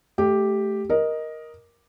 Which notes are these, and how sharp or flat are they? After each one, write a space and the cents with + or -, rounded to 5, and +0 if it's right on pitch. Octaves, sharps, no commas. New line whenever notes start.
A3 -15 G4 +0
A#4 +10 D#5 +0